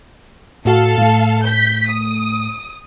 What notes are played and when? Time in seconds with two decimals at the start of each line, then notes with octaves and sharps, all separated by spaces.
0.65 A2 F#4 A4 F5
0.98 A2 A3
1.43 G6 B6
1.88 D#6